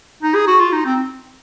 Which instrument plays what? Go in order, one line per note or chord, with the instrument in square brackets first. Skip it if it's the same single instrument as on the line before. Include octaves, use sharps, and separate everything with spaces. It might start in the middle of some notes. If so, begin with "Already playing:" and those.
[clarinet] D#4
G#4
F#4
F4
D#4
C4